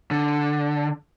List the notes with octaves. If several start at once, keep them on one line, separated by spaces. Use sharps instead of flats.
D3